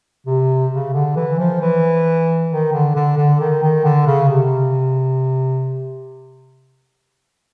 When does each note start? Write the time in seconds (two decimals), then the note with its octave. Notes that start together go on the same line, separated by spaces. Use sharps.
0.27 C3
0.72 C#3
0.94 D3
1.16 E3
1.39 F3
1.61 E3
2.50 D#3
2.73 D3
2.96 D3
3.17 D3
3.40 D#3
3.63 D#3
3.84 D3
4.07 C#3
4.30 C3